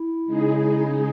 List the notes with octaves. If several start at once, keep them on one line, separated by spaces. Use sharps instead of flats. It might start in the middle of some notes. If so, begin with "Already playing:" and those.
Already playing: E4
C#3 G#3 D#4 G#4